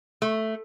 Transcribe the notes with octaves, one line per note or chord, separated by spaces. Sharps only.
A3